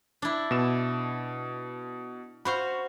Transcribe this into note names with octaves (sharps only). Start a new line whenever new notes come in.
D4 E4
B2 E7
F#4 C5 F5 B5 C#6